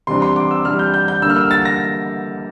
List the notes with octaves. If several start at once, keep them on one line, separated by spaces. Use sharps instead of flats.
C3 E3 G3 D4 C6
C6
D6
E6
C3 E3 G3 D4 F6
G6
G6
G6
D3 G3 A#3 E6
F6
E6
A6
A#6